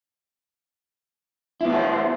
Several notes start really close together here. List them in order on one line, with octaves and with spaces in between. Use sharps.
E4 B3 F#4 C#5 C5